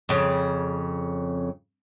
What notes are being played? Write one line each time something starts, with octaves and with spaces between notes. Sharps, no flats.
F2 C#3